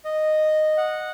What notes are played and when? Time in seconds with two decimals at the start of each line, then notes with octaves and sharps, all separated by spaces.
0.05 D#5
0.77 F#5